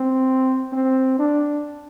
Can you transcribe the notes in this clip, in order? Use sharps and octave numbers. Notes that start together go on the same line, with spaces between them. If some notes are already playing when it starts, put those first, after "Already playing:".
Already playing: C4
C4
D4